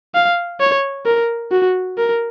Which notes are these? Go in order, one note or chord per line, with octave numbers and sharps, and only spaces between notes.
F5
C#5
A#4
F#4
A#4